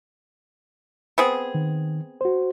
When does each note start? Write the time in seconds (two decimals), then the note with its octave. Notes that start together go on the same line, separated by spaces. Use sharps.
1.18 B3 C4 G#4
1.55 D#3
2.21 F#4 C5